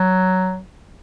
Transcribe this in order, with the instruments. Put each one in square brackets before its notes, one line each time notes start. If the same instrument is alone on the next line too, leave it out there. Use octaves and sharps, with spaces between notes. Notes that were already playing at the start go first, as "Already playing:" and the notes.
Already playing: [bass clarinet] F#3